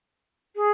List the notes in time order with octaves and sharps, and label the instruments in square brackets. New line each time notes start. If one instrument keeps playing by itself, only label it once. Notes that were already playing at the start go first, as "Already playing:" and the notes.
[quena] G#4